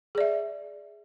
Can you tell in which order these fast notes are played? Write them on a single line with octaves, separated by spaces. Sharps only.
G#4 D5 E5